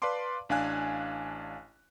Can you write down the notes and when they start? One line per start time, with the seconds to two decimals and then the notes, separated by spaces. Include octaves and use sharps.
0.02 B4 D5 F5 A5 C6 D6
0.49 A1 D4 F5 G#5 F#6